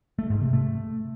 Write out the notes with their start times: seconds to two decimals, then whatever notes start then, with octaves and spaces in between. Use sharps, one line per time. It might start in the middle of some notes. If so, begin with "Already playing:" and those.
0.19 A3
0.30 G#2
0.42 C3
0.53 A3